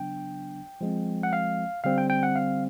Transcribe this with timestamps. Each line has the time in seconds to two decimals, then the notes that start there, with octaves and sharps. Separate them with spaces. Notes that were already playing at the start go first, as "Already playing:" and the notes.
Already playing: C#3 F#3 B3 D4 G5
0.81 F3 G#3 C4
1.23 F#5
1.33 F5
1.84 D3 G3 C4 F5
1.98 G5
2.10 G5
2.23 F#5
2.36 F5